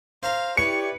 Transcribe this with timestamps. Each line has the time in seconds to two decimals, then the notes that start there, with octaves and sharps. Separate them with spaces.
0.23 C5 F5 A#5
0.57 E4 G4 B4 C#5 D5 C#7